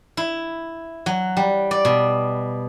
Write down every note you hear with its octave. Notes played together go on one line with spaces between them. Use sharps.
E4
F#3
G3
D5
B2